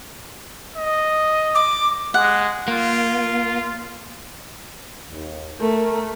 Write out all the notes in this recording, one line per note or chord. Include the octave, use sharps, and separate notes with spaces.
D#5
D6
G#3 F#5
A#3 F4
D#2
A3 A#4